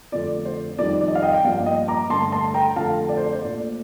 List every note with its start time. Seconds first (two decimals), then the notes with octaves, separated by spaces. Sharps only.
0.12 F2 D3 F3 A3 D5
0.45 C5
0.78 F2 D#3 G3 D5
1.01 D5
1.08 D#5
1.15 F5
1.22 D#5 G5
1.34 G5
1.44 G2 F3 A#3 D5 F5
1.66 D#5 G5
1.88 A#5 D6
2.10 G2 D3 A3 A5 C6
2.32 A5 C6
2.54 G5 A#5
2.76 F2 D3 A3 F5 A5
3.09 D5
3.17 C5
3.33 C5
3.42 A#2 A3 D5